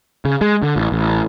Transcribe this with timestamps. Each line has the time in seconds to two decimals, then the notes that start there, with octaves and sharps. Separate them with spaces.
0.25 C#3
0.41 G#3
0.63 D3
0.76 A1
0.92 A1